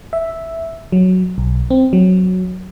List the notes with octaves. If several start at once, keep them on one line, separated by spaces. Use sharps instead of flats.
E5
F#3
B1
C4
F#3